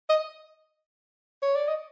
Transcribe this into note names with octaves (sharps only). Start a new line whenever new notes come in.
D#5
C#5
D5
D#5